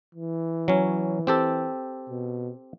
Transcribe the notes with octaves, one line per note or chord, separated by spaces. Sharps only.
E3
F#3 C#4
C4 G4 A4
B2